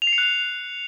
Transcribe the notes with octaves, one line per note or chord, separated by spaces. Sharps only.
F7
C7
C#7
F#6
F7